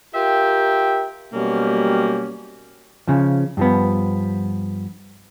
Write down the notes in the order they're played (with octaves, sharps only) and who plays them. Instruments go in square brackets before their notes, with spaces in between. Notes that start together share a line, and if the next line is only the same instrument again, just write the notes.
[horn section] F4 G4 A#4 E5 G5
B2 F#3 G3 A#3 C#4 G4
[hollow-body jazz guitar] C#3 F3
G2 F3 B3